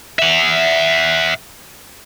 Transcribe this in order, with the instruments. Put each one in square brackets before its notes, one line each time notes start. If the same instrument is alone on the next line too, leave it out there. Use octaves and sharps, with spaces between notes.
[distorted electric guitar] E5 F#5